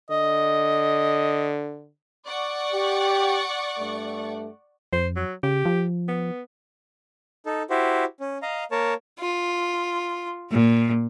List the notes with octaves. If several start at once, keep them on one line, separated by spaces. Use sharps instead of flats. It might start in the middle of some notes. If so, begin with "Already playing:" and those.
D3 D#5
D5 F#5 C#6
G4
G2 A3
F2 C5
F#3
C#3 G4
F3
B3
D#4 A4
E4 F#4 G4 C5
C#4
D#5 F5 A#5
A#3 A#4 C#5 A5
F4
A#2